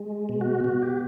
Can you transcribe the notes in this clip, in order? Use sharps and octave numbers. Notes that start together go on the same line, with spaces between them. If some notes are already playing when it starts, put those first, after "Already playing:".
Already playing: G#3
B2
F#4
B2 F#4
G4